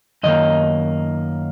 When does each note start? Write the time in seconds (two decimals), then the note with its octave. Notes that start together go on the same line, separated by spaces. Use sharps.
0.23 F#2 D#3 A#3 D#5